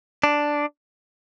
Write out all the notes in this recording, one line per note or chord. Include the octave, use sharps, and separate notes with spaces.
D4